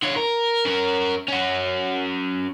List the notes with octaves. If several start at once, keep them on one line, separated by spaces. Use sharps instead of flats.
D3 C#5
A#4
C#4 A#4
C#4 F#4